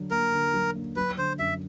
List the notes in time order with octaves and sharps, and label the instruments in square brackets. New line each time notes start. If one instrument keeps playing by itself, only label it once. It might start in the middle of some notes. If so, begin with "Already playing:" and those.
Already playing: [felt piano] D3 F#3
[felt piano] A#3 [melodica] A#4
[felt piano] D3
F#3
A#3
[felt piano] F#3 [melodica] B4
[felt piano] D3 [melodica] C5
[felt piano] F#2 [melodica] E5